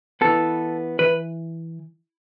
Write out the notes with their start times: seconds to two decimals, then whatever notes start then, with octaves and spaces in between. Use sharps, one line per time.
0.21 E3 B3 A4
0.99 E3 B4